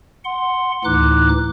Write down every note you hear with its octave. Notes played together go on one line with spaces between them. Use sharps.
F#5 C6
D2 A2 E3 D#4 D6 F#6